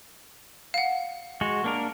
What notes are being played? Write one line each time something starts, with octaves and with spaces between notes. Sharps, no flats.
F5 F#5
G#3 F#4
A#3 D4 A#4